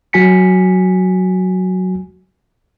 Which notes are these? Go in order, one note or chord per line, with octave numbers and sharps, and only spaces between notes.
F#3 F#4 G#5 B6 C#7